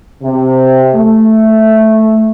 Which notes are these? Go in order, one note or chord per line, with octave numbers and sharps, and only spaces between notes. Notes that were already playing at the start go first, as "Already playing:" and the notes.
C3
A3